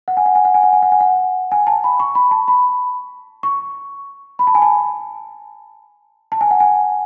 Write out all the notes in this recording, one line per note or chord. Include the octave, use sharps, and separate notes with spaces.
F#5
G#5
F#5
G#5
F#5
G#5
F#5
G#5
F#5
G#5
F#5
G#5
A5
B5
C#6
B5
A5
B5
C#6
B5
A5
G#5
A5
A5
G#5
F#5
G#5